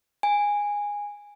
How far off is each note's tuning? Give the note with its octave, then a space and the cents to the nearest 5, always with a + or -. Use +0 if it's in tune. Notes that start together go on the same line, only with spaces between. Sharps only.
G#5 -15